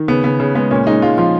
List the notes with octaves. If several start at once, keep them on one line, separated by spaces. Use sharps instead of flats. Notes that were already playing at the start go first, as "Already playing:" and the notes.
Already playing: D#3
C#3 B3
C#3 B3
C#3
G#3 B3
A#2 C#4
G#3 D#4
G#3 F4
F3 F4